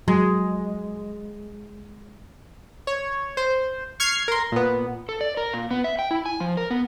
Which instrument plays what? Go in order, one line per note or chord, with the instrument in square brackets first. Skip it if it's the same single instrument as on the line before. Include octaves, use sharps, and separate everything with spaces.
[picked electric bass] F#3 [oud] G#3
[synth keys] C#5
C5
C#6 F6 G#6 C7
A#4 C6
A#2 B3
[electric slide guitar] A4
D5
A#4
A#2
B3
E5
G5
E4
G#5
F3
A#4
B3